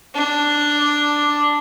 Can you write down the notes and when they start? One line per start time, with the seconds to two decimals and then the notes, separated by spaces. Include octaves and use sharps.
0.15 D4
0.79 D5